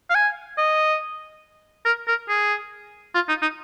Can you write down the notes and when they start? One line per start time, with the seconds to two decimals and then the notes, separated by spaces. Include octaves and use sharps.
0.10 F5
0.15 G#5
0.58 D#5
1.85 A#4
2.08 A#4
2.29 G#4
3.15 F4
3.28 D#4
3.42 D#4